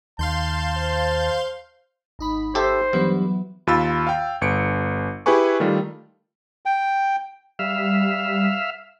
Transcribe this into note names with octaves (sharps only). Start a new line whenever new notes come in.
D#2 F5 A5 C6 G6
C5
G#1 D#4 B5
G4 A4 C5 E5
G2 E3 F#3 B3
D#2 F4 B5 E6 A6
F5 G5
G1 C#7 D7
E4 G4 G#4 B4 G#5 C#6
D#3 G3 A3 F4
G5
G3 E5 F5